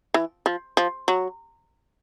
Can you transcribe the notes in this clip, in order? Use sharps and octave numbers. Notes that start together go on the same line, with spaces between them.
E3
F3
F3
F#3